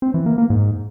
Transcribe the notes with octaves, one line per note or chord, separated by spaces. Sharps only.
C4
E3
A#3
A#3
G#2